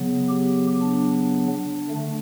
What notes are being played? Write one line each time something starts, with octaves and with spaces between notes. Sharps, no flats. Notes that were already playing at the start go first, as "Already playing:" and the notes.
Already playing: C#3 F#3 B3
G4
D4
D3 A3